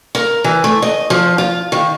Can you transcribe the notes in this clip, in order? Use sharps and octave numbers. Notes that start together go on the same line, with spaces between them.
A#4
E3
A3
D#5
F3
F4
D#3